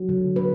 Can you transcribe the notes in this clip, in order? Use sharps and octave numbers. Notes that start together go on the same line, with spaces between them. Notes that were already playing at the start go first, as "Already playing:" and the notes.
Already playing: F#3
D3
D3 B4